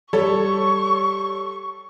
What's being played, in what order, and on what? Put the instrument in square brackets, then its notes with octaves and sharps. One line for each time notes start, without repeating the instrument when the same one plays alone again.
[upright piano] G3 A4 C#5 [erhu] C#6